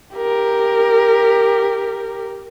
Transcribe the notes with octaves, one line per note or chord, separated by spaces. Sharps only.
G4 A#4